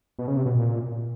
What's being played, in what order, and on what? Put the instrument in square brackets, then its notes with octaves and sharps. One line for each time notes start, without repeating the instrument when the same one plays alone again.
[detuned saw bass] B2
C#3
C3
B2
A#2